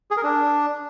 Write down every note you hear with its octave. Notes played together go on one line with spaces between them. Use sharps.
G#4
A#4
D4